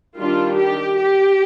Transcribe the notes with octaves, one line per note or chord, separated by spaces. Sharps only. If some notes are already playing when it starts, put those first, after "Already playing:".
D#3 G3 D4 F4
G4
G4